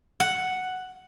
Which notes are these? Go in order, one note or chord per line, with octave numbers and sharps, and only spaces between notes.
F#5